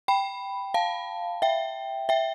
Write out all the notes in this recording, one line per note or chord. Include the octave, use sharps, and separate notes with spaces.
G5 B5
F5 A5
E5 G5
E5 G5